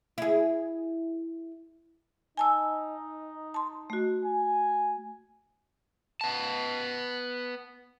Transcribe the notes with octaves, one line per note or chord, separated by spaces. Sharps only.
E4 G#4
D#4 G#5 A5 E6
A5 C6
A3 F#4
G#5
B3 A5